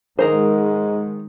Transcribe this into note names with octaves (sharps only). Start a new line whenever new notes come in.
G#2 D#3 G#3 G#4 A#4 C5